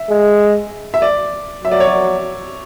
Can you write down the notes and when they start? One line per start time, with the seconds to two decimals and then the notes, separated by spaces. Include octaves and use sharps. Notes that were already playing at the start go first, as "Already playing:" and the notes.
Already playing: E5
0.10 G#3
0.94 E5
1.02 D5
1.64 F#3 E5
1.72 D5
1.80 C#5
1.88 D5